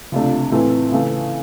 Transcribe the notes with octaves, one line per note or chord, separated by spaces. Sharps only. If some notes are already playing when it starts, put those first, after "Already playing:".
C#2 C3 F3 A3 D4
A2 E3 A3 C4
C#3 E3 A3